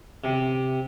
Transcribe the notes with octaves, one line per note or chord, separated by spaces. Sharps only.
C3